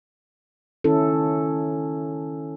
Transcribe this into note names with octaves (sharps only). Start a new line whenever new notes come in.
D#3 C#4 E4 A4